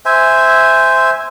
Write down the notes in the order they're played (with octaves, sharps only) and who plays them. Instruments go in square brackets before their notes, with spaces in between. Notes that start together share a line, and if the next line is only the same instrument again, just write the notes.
[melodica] C5 E5 G#5